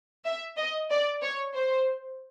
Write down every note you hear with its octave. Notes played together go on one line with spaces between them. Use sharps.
E5
D#5
D5
C#5
C5